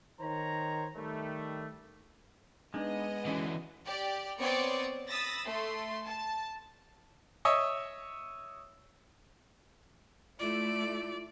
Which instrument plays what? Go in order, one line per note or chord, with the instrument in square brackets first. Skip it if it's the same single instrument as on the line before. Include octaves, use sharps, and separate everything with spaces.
[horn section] D#3 C5 C#5 A#5
D#3 G3 A3
[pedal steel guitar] G#3 [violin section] B3 D#5 [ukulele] D4 D#4
[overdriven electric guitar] D3 E3 [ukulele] C#4 F4 F#4
[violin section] G4 D5
B3 C4 C#5 D5 D#6 C#7
B5 D#6 E6 A6 A#6
A3 C6
A5
[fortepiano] C#5 D#5 E5
[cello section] A3 E4 [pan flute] F4 [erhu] D5